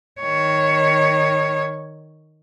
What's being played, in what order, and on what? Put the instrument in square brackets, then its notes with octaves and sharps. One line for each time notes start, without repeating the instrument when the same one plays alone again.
[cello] D#3 C#5